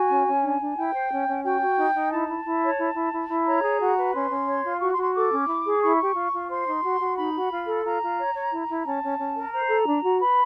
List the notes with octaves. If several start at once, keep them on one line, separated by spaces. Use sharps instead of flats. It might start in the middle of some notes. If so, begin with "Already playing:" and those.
Already playing: F#4 G#5
C#4
C#4
D4
D4
E4 G5
C5
C#4
C#4
F#4 G5
F#4
D#4
D#4
E4 A5
E4
E4
C#5
E4
E4
E4
E4
C#5 A#5
G#4
F#4
B4
C#4 C6
C#4
C#5
F4
F#4 C#6
C6
F#4
C6
A4 D6
C#4
E4
G#4
E4 C#6
G4
F4
F4
C5 C6
D#4
F#4
F#4
D#4 B5
F#4
F4
A4
F4 A#5
F4
C#5
C#5
E4
E4
C#4 A5
C#4
C#4
A#4
C5 A#5
A4
D4
F#4
B4 B5